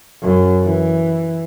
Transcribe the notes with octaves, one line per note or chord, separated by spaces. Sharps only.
F#2
E3